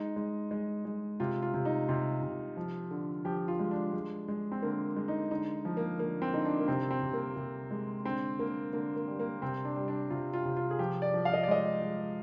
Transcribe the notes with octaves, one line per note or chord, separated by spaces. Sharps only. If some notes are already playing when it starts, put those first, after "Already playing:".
Already playing: G#3 D#4
G#3
G#3
G#3
C3 F4
F4
C3
D#4
C3 F4
C3
F3
D3
F3 G4
F4
G#3
D4
G#3
G#3
C4
D3 A#3
G#3
D#4
D3 D#4
F3
A#3
D3 A#3
C4
D3 D#4
D4
A#3
C3 C4
C4
C3
A#3
C3
G#3
D3 C4
D3 A#3
D3 A#3
A#3
G3
A#3
C3 C4
D4
G3
D4
C3 F4
F4
C3
F4
G#4
F3 G4
D5
F3
F5
D#5
D5
G#3 D#5
G#3